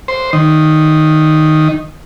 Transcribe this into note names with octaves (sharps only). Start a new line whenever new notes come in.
C5
D#3